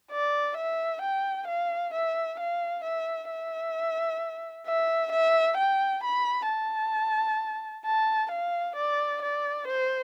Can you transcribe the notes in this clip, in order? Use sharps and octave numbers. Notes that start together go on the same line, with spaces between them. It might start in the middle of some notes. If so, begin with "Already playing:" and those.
D5
E5
G5
F5
E5
F5
E5
E5
E5
E5
G5
B5
A5
A5
F5
D5
D5
C5